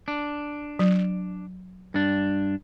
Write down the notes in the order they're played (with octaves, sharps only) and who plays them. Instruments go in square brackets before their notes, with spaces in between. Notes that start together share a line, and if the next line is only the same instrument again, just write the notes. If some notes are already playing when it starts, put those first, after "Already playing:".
[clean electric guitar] D4
[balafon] F#3
[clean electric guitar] G2 D4